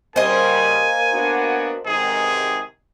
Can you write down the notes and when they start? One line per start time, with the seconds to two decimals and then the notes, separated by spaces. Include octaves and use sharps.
0.16 C#3 G3 A#3 C5 D#5 G#5
1.12 B3 D4 F#4
1.86 A1 G#2 C3 D#3 G#3 G#4